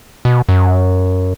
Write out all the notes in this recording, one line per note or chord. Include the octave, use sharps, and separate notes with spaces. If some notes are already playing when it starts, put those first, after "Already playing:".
B2
F#2